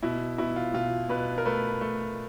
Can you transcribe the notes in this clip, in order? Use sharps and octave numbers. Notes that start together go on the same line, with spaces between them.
B2 E4
B2 E4
F4
B2 F4
B2 B4
A#4
A3 B4
A3